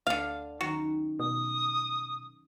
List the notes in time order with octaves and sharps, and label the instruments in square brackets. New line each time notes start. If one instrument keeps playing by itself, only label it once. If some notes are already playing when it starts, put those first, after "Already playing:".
[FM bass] D2 [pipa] D3 F5
[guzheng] F#2 D#3 D#4 [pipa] F#4
[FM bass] B2 [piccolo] D#6